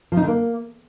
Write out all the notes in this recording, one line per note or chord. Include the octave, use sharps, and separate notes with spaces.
F3
D#4
D3
A#3